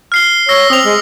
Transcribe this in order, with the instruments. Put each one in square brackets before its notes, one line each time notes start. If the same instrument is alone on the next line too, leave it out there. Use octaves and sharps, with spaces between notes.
[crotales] F6 C7 G7
[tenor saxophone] C#5 [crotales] E6 A#6 G7
[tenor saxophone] C4 [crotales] D#6 F7
[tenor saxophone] G#3